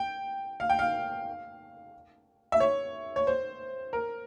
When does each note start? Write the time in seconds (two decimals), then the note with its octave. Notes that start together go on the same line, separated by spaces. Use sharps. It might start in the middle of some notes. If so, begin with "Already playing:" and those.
Already playing: G5
0.60 F5
0.70 G5
0.79 F5
2.52 E5
2.60 C#5
3.16 C#5
3.27 C5
3.93 A#4